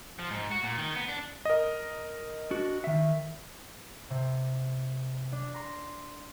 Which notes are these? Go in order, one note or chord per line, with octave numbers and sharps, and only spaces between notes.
F3
G#2
F#4
A#2
D#3
B3
D4
A#4 D#5
D4 F#4
D#3 E5
C3
D4
A#5 C6